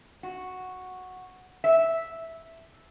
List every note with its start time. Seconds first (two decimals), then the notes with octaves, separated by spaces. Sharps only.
0.23 F#4
1.64 E5